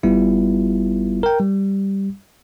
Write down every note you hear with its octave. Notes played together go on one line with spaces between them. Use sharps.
G1 G3 B3 E4 F4
A#4 G5
G3